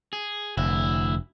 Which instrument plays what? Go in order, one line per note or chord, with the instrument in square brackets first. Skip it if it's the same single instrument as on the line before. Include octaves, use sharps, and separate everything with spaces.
[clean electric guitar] G#4
[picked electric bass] F1 [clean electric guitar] D2 E4